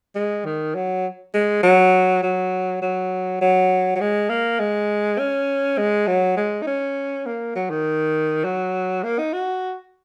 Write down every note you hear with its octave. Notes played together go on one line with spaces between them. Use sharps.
G#3
D#3
F#3
G#3
F#3
F#3
F#3
F#3
F#3
G#3
A#3
G#3
C#4
G#3
F#3
G#3
D#4
C#4
A#3
F#3
D#3
F#3
A#3
D#4
F#4